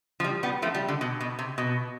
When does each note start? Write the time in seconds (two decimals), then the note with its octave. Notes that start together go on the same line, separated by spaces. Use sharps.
0.20 F3
0.24 G3
0.43 G3 B3
0.62 F3 A3
0.75 G3
0.88 D3
1.01 B2
1.21 B2
1.39 C3
1.58 B2